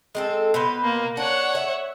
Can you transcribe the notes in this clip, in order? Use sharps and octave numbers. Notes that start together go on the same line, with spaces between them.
G#3 C4 A4
B2 B4 C5
A#3
D4 C#5 F#5
E5